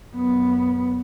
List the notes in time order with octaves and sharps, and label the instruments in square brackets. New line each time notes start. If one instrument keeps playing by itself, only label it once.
[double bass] F#2 B3